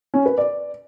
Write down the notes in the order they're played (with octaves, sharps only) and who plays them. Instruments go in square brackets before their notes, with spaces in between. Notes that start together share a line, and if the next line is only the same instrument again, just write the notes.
[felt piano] C#4
B4
D5